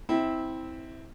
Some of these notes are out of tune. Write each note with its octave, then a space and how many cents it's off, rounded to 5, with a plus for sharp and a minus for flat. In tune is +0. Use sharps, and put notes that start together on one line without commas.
C4 +0 E4 -20